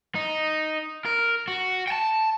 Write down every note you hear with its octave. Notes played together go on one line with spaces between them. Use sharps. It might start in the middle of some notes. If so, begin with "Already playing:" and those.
D#4
A#4
F#4
G5 A5